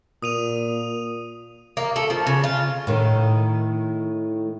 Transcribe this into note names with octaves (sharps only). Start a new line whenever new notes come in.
A#2 D#6 D#7 F7
A#3
A3
F3
C#3
F4
A2 D#3